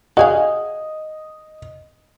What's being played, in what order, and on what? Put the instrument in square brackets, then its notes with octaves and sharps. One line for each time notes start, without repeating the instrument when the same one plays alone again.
[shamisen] F#4 G#4 F5 [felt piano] D#5